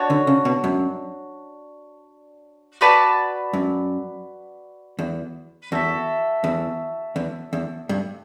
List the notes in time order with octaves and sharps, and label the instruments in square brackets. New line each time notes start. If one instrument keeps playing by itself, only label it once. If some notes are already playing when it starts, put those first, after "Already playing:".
Already playing: [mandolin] D4 F#4 C#5
[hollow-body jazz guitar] D3
C#3
B2
F#2
[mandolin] F#4 B4 D5 A5
[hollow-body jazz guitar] F#2
E2
[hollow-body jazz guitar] E2 [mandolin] F#4 A4 E5
[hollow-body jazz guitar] E2
E2
E2
G2